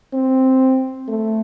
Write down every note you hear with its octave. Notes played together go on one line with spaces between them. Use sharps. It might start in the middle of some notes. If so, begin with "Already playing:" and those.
C4
A3